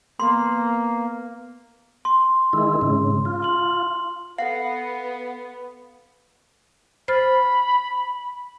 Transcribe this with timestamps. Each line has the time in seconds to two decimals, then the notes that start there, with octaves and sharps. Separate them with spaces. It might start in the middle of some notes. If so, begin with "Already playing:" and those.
0.20 A#3 B3 C6
2.05 C6
2.53 D#3 G#3 E4
2.81 G#2 C#3
3.25 F4
3.42 C6 F#7
4.38 B3 A4 F5 F#5 C7
7.08 C5 B5 F6 A6